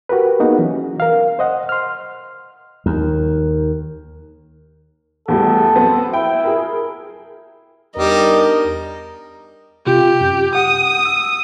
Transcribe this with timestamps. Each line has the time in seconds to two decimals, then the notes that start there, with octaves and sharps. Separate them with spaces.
0.09 F#4 G4 A#4 B4
0.40 A#3 B3 D#4 F#4 G#4 F#5
0.59 E3 F#3 C#4
1.00 A#4 F5
1.39 C5 D#5 F#5
1.69 C6 F6
2.86 D#2
5.28 E2 A2 G3 A4
5.76 F#3 B3 C4
6.13 E4 G5
6.44 G#4 A#4
7.96 E2 G3 D4 D#4 A#4 D#5
9.87 C3 F4 G4
10.21 F#2
10.55 F#5 D#6
11.05 E6